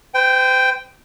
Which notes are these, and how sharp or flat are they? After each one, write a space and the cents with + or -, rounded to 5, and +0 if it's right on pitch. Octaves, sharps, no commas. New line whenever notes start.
C5 -40 G5 +0